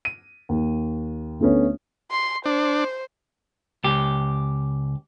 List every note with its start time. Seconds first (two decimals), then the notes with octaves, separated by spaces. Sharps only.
0.05 D#7
0.49 D#2
1.40 D2 A3 B3 C#4
2.11 C6
2.46 D4 C5
3.84 C#2 G4